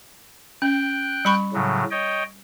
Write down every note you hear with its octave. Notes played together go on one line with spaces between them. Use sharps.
C#4 G5 F#6
G3 B5 C#6
A2 C#3 F#3
C#5 D#5 G5